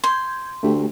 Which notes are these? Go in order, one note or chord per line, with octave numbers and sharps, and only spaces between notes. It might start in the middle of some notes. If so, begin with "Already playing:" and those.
C6 G6 G#6
D2 A3 G4